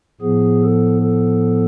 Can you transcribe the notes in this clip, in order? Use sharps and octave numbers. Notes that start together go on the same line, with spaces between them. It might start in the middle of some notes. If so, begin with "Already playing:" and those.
A2 F3 B3 G#4
A4
A4